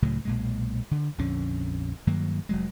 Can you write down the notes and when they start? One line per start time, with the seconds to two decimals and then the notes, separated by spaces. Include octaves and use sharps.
0.02 C#2 A2 C#3 F#3
0.25 B1 A#2 G#3
0.91 D3
1.18 A#1 F2 D3 C#4
2.07 G2 D#3 F#3 A#3
2.49 F1 F#3 G#3